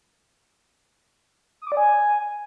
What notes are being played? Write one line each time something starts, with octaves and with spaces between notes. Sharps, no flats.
D#6
D6
D5
G#5